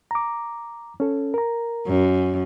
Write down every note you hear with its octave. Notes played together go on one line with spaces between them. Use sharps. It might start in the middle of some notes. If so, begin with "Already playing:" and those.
A#5 D6
C#4 A4
A#4 A#5
F#2